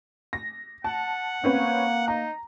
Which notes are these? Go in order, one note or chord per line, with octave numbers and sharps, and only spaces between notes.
A#6
F#5 A5
A#3 C4 C#4 B4
D#4 A#5